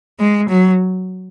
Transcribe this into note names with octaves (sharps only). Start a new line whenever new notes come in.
G#3
F#3